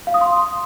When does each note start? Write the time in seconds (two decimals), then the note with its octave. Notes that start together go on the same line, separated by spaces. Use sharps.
0.07 F5
0.14 D#6
0.21 C6